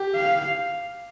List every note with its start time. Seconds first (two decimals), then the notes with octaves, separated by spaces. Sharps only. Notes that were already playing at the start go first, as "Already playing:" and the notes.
Already playing: G4
0.15 F5